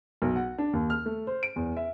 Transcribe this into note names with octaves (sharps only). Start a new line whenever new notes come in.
B1
F#5
D4
D#2
F6
A3
C5
D7
E2
E5